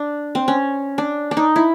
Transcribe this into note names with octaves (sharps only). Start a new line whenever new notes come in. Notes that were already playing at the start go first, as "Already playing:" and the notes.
Already playing: D4
C4
C#4
D4
D4
D#4
E4